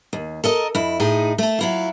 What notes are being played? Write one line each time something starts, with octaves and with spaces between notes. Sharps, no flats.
D#2
A4 A#4 D#5
F2 E4
A2 D#4 G#4
A3 A4
F#3 E4 F4